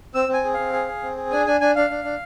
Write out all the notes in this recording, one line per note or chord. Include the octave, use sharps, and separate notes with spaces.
C4 E6
C4 G#5
G#4
C4 F5
G#4
G#4
C4
G#4
D4 G#5
D4 G#5
D4 G#5
D4 F5
D4
D4